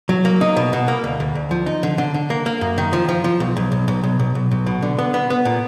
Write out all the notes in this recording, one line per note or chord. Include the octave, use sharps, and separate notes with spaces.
F#3
A#3
D#4
B2
B2
A#3
D2
D2
D2
F3
D#4
D3
D3
D3
A#3
A#3
F#2
D#3
F3
F3
F3
B1
B1
B1
B1
B1
B1
B1
B1
B2
D3
B3
B3
B3
A#2